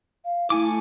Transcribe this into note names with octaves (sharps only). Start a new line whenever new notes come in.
F5
A3 E4 G#5 D6